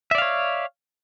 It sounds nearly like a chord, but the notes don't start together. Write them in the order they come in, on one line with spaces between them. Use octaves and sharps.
E5 D5 F5 C#5